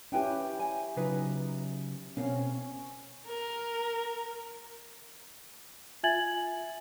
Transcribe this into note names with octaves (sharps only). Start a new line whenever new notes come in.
C#4 E4 G4 B4 G5 G#5
G#5
C#3 F#3 D#4 F4 B4
B2 C4 C#4 A#4 F5
A#4
F4 E5 G#5 G#6 A6 F#7